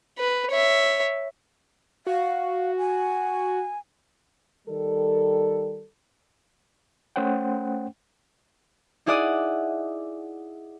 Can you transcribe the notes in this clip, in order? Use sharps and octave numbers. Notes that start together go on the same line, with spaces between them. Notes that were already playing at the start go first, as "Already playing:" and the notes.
B4
C#5 E5
F#4 F5
G#5
D#3 G3 A4
A3 C#4 C5 F#5 G5
D#4 E4 G#4 D5 F#5 D#6